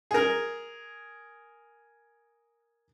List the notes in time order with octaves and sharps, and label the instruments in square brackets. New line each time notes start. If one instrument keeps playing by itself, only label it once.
[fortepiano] G#4 A#4